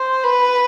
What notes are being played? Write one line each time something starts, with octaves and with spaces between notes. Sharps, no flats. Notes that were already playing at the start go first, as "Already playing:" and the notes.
Already playing: C5
B4